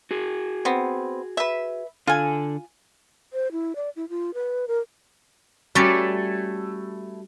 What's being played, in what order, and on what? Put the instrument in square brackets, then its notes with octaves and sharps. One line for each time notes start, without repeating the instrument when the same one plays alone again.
[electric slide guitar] F#4 G#4
[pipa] B3 C4
B4 E5
[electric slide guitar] D3 A4 [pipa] F4 G#5
[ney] C5
E4
D5
E4
F4
B4
A#4
[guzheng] G3 C#4 D5 [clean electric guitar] A3 E4 A4 [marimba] F#4